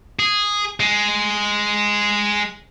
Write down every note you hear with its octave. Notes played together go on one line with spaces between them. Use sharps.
G#4
G#3